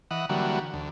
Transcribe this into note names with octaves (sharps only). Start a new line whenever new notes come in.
E3 D#5 F#5
D3 E3 F#3 G3 A#3 F#4
D2